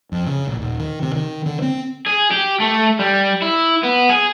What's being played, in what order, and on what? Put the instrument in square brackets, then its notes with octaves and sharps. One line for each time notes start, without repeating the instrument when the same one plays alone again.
[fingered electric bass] F2
C#3
A#1
D#1
D#3
C3
D#3
D3
C4
[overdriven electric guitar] G#4
G4
A3
G3
E4
B3
G#4